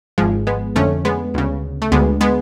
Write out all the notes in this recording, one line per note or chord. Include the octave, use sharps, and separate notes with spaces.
G#1 G#2 F3 G#3
G#3 B3
F2 D3 A3 C#4
G#3 B3
D2 C#3
A3
D2 D3 G#3 B3
G#3 B3